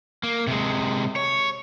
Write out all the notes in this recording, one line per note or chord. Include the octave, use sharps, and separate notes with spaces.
A#3
C3 G#3
C#5